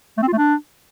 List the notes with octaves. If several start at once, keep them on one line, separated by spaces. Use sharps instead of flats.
A3
C4
F4
A3
D4